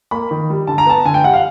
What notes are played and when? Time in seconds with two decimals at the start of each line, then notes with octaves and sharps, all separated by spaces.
0.11 A#3 B5
0.31 D#3
0.50 G3
0.67 D3 A5
0.78 A#5
0.86 B3 A5
1.05 D3 G#5
1.14 G5
1.24 G3 F#5
1.33 F5